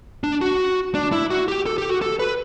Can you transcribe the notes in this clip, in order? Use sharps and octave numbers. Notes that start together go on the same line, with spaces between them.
D4
F#4
D4
E4
F#4
G4
A4
G4
F#4
A4
B4